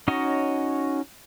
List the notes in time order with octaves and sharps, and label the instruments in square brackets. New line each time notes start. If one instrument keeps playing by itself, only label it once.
[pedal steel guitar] C#4 D#4 F#4 C#5 D#5